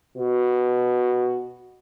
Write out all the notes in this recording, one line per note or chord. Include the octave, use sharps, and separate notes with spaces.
B2 F#4